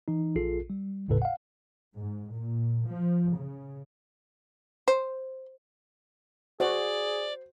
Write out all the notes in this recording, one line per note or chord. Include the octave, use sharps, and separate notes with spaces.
E3 D#4
A#1 F4 G#4 A4 C7
G3
G#1 D#2 A2 C#3 A4 B4
F5 F#5
G#2
A#2
F3
C#3
C5
F#4 G#4 C5 D5